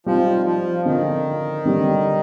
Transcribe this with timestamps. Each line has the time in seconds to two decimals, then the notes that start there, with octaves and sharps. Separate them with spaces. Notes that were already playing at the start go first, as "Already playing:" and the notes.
0.06 F3 G3 C4 D#4
0.46 F3
0.85 D3 D#3 F3 C4 F4
1.65 D3 G3 C4